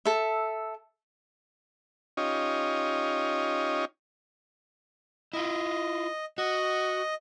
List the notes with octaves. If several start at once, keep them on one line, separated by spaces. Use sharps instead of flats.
A4 E5
C#4 D#4 F4 G4 C#5 D#5
E4 F4 D#5
F#4 D#5